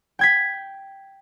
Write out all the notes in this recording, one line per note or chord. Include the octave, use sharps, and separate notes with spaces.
G5 G#6 B6